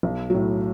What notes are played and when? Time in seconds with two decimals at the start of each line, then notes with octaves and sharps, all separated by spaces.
0.03 B1
0.30 A2 F#3